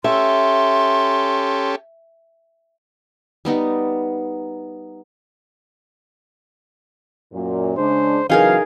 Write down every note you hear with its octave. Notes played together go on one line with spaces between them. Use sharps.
C#4 G4 A4 E5 C6
G3 B3 D#4
F#2 A#2
C#3 G#3 D4 C5
C#3 E3 F#3 D#4 G#4 A#4 F5